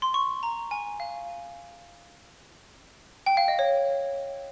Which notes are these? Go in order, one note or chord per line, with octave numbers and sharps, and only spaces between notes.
C6
C#6
A#5
G#5
F5
G5
F5
D#5
C#5